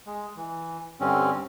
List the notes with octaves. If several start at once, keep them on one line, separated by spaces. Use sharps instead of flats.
G#3
E3
G2 D3 C4 C#4